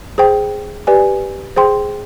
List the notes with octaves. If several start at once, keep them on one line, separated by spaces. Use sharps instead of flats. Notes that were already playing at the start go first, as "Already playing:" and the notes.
G#4 C5 G5
G4 B4 D5 G#5
G#4 C5 G5 C6